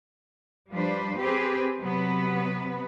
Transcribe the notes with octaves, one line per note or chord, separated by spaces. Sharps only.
F3 G3 D4 B4 C5
C4 G4 G#4 B4
C3 F#3 B3 B4